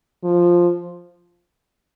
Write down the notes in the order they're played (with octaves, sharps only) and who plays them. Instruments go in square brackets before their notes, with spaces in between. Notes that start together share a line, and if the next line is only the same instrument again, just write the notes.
[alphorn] F3